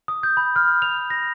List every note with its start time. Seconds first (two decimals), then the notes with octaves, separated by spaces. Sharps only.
0.08 D#6
0.23 G6
0.37 B5
0.56 F6
0.82 F7
1.10 A#6